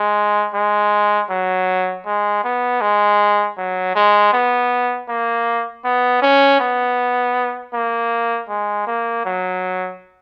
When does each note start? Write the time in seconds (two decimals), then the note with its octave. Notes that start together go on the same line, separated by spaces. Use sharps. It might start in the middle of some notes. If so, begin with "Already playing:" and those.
Already playing: G#3
0.55 G#3
1.30 F#3
2.06 G#3
2.44 B3
2.81 G#3
3.57 F#3
3.95 G#3
4.33 B3
5.09 A#3
5.84 B3
6.22 C#4
6.60 B3
7.73 A#3
8.49 G#3
8.87 A#3
9.25 F#3